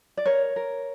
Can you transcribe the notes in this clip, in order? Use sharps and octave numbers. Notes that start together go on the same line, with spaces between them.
D5
A#4 C#5
A#4